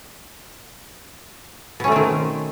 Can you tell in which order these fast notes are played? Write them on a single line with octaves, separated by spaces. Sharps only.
B2 C#4 A3 C4 D#3